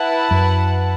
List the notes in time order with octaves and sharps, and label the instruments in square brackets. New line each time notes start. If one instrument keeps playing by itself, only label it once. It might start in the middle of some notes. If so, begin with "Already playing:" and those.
Already playing: [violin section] E4 B4 F#5 A5
[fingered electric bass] F#2